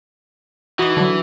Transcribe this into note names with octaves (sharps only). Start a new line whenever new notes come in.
E3 D#4 F#4 D#5
D3 F#3